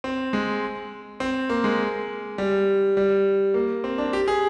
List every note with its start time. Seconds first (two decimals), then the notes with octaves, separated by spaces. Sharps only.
0.04 C4
0.33 G#3
1.20 C4
1.49 A#3
1.64 G#3
2.38 G3
2.97 G3
3.54 A#3
3.84 C4
3.98 D4
4.13 G4
4.28 G#4